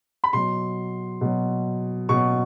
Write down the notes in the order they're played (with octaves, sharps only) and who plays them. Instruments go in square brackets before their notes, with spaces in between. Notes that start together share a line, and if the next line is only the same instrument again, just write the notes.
[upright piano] B5
B2 F#3 C6
B2 F#3
B2 F#3 C#6